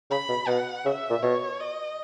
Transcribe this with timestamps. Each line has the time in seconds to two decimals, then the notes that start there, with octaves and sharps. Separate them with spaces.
0.11 C#3 B5
0.29 B2
0.47 B2 F#5
0.86 C#3 E5
1.10 A#2
1.23 B2 C#5
1.60 D#5